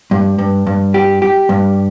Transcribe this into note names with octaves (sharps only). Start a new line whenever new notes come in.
G2
G2
G2
G4
G4
G2